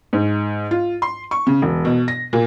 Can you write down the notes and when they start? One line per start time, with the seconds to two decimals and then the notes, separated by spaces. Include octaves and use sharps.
0.13 G#2
0.71 F4
1.02 C6
1.31 C#6
1.47 C#3
1.62 E1
1.85 B2
2.08 A#6
2.33 A#2